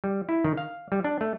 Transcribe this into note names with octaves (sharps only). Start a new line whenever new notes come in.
G3
E4
D#3
F5
G3
D4
A3